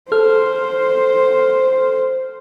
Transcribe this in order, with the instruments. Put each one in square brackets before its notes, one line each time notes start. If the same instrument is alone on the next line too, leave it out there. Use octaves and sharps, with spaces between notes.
[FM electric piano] A4 F6 [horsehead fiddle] C5